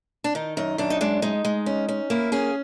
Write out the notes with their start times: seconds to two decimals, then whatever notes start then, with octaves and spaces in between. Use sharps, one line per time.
0.24 D4
0.35 D#3 D#4
0.57 F#2 D#4
0.78 F#2 D4
0.90 D#4
1.01 G#3 D4
1.22 G#3 D#4
1.45 G#3
1.66 C#4
1.89 C#4
2.10 A#3 E4
2.32 C#4 G#4